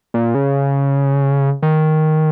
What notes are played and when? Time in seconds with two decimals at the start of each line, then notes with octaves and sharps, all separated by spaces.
0.14 A#2
0.35 C#3
1.63 D#3